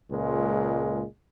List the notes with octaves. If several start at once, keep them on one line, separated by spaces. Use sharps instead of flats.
C#2 A#2 G#3